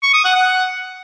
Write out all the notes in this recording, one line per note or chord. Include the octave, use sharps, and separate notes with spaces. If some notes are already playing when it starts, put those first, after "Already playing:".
C#6
D#6
F#5
F#5